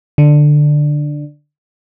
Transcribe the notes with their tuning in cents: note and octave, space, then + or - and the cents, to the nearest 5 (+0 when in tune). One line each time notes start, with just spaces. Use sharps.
D3 +10